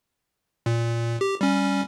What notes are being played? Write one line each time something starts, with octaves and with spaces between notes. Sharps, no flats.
A#2
G4
G3 C#4